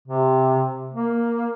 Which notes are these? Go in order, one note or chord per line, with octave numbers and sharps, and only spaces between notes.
C3
A#3